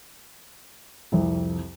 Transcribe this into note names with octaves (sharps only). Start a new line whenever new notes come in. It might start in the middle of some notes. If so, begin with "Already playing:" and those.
C2 F2